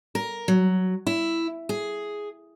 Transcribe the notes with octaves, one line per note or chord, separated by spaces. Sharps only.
A#4
F#3
E4
G#4